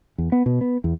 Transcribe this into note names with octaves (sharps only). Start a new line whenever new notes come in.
E2
B3
B2
B3
E2